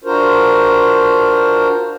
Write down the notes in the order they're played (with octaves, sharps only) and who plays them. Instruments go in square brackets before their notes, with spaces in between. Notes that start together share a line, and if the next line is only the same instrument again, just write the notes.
[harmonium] D4 F4 F#4 A#4 C5